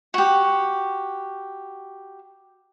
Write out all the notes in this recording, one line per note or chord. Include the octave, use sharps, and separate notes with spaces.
F#4 G4